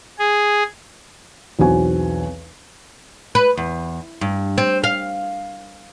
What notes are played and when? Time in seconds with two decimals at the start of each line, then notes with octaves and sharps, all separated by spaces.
0.19 G#4
1.59 B1 E2 C4 F#4 G#5
3.35 B4
3.57 E2
4.21 G2
4.58 C4
4.84 F5